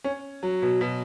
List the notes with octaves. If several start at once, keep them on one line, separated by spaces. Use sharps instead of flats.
C#4
F#3
B2
B2